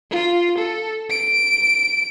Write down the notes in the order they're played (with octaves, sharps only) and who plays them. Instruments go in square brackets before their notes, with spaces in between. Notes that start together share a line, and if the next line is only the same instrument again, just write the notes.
[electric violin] F4
A4
D7